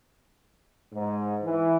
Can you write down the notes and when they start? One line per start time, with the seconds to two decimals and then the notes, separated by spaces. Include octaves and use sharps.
0.93 G#2
1.43 E3